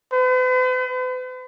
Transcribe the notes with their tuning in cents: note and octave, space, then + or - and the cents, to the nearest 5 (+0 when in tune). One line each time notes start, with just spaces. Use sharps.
B4 +45